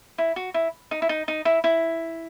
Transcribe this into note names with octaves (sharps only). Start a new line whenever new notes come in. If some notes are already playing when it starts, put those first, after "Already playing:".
E4
F#4
E4
D#4
E4
D#4
D#4
E4
E4